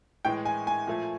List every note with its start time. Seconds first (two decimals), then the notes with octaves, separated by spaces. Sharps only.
0.25 A2 E3 G#3 G5
0.45 G#5
0.67 G#5
0.87 A#2 F3 A3